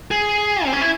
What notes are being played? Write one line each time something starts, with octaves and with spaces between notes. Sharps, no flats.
G#4
C4
C#4
E4